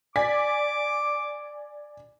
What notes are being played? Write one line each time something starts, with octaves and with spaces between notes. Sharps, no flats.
D5 G#5 D6 B6